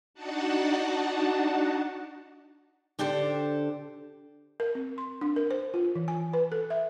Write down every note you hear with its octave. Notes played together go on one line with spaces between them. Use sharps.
D4 D#4 F#4 F#5 A5
D3 D4 G4 A4 C5
A#4
C4
C6
D4
A#4
C5
F4
E3
G#5
B4
A4
E5